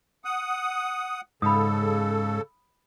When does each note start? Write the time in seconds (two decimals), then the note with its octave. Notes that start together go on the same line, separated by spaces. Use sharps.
0.25 F#5 D#6
1.42 G#2 C#3 A4 B5 D#6